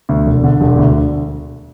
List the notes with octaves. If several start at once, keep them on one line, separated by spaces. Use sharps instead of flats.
D2
E1
D3
E1
D2